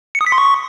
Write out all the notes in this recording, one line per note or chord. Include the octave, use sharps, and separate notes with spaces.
C#7
D#6
B6
C6
C#6